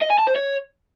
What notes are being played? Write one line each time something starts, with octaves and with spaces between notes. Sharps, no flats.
D#5
G#5
A5
C5
C#5